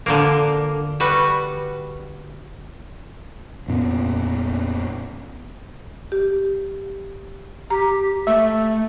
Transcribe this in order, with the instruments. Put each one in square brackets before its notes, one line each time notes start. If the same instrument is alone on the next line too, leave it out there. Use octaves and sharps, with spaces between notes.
[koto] D3 F3 A#3
G3 F#4 B4
[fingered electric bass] F2 A#2 B3 C#4
[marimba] G4
[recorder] G4 [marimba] A#5
[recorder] A3 [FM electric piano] E5